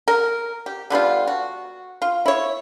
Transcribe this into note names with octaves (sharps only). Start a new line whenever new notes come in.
A#4
G4
D3 G3 B3 F4
F#4
F4
E4 C#5